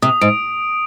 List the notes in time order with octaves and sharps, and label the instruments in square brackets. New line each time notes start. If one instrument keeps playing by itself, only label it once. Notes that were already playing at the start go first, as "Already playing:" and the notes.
[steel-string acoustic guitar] C3 [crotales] D#6
[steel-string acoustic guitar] G#2 [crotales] D7